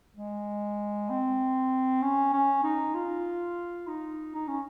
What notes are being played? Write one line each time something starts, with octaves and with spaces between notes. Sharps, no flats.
G#3
C4
C#4
C#4
D#4
F4
D#4
D#4
C#4